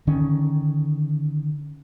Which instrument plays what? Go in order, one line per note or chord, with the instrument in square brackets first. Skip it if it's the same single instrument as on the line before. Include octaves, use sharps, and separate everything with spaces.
[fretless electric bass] D3 D#3 C#4